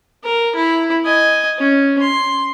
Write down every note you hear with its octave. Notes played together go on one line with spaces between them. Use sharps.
A#4
E4
D#5 G#5
C#4
C6